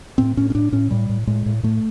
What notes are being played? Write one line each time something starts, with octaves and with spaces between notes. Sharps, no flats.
A2 C4
A2 C#4
C#4
A2 D4
A2 C#4
A2 G3
A2
A2 G#3
A2
A2 A3